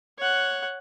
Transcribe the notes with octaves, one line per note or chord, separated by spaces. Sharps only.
C#5 F#5